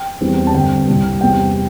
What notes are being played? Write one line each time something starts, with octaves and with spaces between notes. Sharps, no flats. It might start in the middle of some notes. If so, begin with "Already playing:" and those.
Already playing: G5
E2 E3 G3 C4
A5
G2 D3 C4 G5
C2 C3 G3
E2 C3 G3 G5